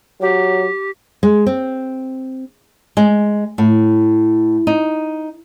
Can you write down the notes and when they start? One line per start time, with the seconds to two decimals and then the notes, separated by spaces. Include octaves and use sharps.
0.21 F#3 G4
1.23 G#3
1.46 C4
2.97 G#3
3.58 A2
4.67 D#4